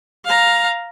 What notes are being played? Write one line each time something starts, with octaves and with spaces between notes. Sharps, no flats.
F5 A#5